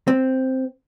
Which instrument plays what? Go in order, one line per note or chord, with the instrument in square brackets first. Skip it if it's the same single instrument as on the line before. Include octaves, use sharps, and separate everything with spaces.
[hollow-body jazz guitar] C4